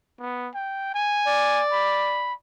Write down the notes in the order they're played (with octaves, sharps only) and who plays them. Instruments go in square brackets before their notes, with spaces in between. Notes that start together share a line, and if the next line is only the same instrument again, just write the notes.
[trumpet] B3
G5
G#5
[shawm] D5
[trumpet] B5